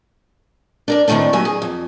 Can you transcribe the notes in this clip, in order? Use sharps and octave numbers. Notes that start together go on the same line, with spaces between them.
D4 A#4 D5
A2 D#3 F3 A3 C4 D4
F#3 A#3 G4 G#5
G#4
F2